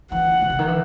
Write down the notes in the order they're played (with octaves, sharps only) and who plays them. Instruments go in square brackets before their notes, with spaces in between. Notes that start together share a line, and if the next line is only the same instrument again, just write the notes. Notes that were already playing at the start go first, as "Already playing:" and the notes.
[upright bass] E3 [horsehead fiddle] F#5
[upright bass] B2
C3
D#3
E3